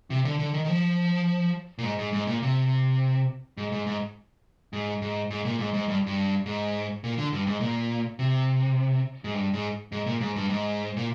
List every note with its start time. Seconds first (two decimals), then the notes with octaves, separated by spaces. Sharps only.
0.10 C3
0.25 D3
0.39 D3
0.54 D#3
0.65 D#3
0.68 F3
1.78 A#2
1.83 G#2
1.98 G#2
2.13 G#2
2.27 A#2
2.42 C3
3.57 G#2
3.72 G#2
3.87 G#2
4.73 G#2
5.02 G#2
5.31 G#2
5.45 A#2
5.59 G#2
5.74 G#2
5.88 G2
6.07 G2
6.46 G#2
7.04 A#2
7.18 D3
7.33 G2
7.47 G#2
7.61 A#2
8.19 C3
9.24 G#2
9.34 G2
9.54 G#2
9.92 G#2
10.06 A#2
10.21 G#2
10.36 G2
10.50 G#2
10.97 A#2